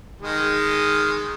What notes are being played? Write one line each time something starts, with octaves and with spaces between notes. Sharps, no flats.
D#3 G#3